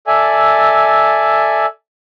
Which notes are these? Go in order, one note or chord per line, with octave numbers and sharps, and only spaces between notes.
A4 D5 E5 G#5